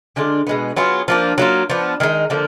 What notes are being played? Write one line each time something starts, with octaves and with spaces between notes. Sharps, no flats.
D3 G#3 D4 F4
B2 G#3 B3
F#3 B3 F4 G#4
F3 A#3 D4
F#3 A#3 F4
F3 B3 D4
D#3 G#3 D#4
D3 F3 A#3